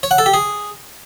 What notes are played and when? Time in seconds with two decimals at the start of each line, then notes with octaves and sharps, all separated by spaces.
0.03 C#5
0.11 F#5
0.18 A4
0.26 G4
0.34 G#4